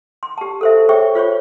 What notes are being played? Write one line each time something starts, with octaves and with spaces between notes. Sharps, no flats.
C6
G4 A5
A4 C5 E5
G#4 C5 C#5 E5 G5 C#6
F4 C5 C#5 C#6